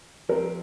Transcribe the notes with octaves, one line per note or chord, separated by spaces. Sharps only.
F3 C4 G4 A#4